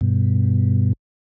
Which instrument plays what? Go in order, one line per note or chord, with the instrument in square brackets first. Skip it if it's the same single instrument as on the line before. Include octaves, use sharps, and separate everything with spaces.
[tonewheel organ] G2 B2